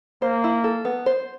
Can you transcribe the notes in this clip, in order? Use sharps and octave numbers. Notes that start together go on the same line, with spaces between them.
A#3 C5
E4
A4
B3
C5